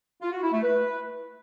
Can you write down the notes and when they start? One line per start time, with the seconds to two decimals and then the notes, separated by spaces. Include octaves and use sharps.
0.21 F4
0.31 F#4
0.42 E4
0.52 A3
0.62 B4